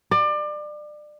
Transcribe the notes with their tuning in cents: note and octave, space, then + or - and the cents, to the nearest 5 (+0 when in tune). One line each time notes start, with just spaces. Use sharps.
D5 +30